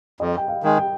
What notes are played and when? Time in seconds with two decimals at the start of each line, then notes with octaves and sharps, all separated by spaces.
0.20 F2 D#5
0.37 G5
0.48 F5
0.63 D#3 G#3
0.78 G5